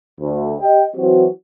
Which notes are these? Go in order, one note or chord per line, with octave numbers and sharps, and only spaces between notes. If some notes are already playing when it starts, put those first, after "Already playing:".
D2
G4 D#5 G5
E3 F#3 C4 F#4